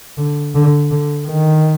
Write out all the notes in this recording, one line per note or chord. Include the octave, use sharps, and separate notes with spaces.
D3
D3
D3
D#3